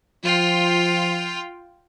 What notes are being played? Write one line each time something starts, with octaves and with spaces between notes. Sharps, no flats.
F3 F4 G5